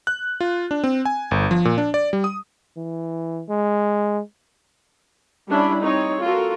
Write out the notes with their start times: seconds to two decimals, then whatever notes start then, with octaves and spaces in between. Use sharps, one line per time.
0.07 F#6
0.41 F4
0.71 D4
0.84 C4
1.05 G#5
1.31 G1
1.51 F3
1.65 A#2
1.78 D4
1.94 D5
2.13 G3
2.24 D#6
2.77 E3
3.49 G#3
5.49 G3 C#4 D4 E4 E5 B5
5.82 C4 D#4 C#5
6.22 F4 F#4 A4 A#4